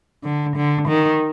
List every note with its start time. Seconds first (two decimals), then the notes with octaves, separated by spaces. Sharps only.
0.24 D3
0.56 D3
0.88 D#3